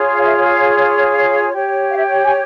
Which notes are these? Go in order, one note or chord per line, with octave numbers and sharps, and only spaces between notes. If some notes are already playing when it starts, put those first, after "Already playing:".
Already playing: F4 G#4 C#5
F5
E5
F5
F5
G4 C#5
F5
E5
G5
G#5